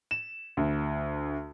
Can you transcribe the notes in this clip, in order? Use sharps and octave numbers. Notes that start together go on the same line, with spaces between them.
E7
D2